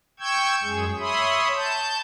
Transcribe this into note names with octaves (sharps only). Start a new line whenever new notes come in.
G5 C#6 E6 G6 G#6
F#2 G#3 G#4
C#5 E5 B5 C6 D#6
A5 G6